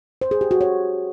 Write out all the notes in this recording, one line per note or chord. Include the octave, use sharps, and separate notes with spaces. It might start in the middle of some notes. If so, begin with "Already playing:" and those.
C5
G#4
G4
F#4
C#5